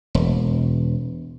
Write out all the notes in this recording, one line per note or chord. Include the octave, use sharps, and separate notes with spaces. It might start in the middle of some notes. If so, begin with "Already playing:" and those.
E1